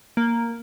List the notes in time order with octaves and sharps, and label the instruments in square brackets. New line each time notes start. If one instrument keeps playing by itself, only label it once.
[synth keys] A#3